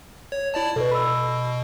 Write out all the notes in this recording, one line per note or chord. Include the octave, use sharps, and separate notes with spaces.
C#5
E4 D5 A5
B2 A4 B4
B5 E6